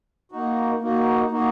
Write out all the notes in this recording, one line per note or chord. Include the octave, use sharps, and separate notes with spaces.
A#3 D#4 F#4
A#3 D#4 F#4
A#3 D#4 F#4